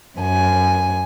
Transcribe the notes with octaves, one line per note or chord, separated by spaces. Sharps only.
F#2 G#5